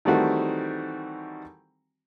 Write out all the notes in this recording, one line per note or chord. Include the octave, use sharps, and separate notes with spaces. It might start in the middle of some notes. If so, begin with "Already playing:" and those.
D#3 E3 G3 A3 C4 F#4